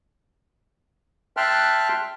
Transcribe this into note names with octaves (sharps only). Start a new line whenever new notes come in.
E5 G5 A5 C6 F6 F#6